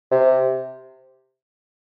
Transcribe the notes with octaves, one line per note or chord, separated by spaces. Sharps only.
C3